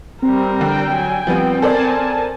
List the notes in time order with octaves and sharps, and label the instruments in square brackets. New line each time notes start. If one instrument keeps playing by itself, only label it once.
[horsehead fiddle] G3 A#4 [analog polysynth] C4
[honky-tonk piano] D3 [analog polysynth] G5
[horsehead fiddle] F#3 G#5
[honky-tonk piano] F3 G3 B3 [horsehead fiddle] C4
[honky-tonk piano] A4 C5 D5 [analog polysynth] A#4 G#5 A5